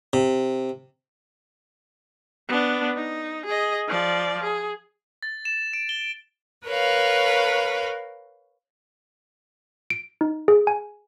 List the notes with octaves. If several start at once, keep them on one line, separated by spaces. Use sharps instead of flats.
C3
B3 D4
D#4
G#4 D#5
F3 D5
G#4
A6
E7
D7
G7
A#4 B4 C#5 F5
D7
D#4
G#4
G#5